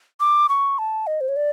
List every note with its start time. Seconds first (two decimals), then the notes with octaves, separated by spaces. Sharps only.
0.20 D6
0.49 C#6
0.79 A5
1.07 D#5
1.21 C5
1.29 C#5
1.36 D5